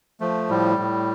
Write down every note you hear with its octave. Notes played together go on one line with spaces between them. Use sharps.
F3 A3
A2 G3
A2